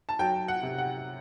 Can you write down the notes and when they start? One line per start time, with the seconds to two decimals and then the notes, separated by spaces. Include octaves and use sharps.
0.09 A5
0.19 F#3 G5
0.48 F#5
0.63 C3
0.78 F#5